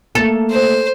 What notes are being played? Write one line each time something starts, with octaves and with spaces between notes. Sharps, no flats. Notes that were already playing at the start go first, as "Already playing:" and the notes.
A3 A#3 A4 E7
C5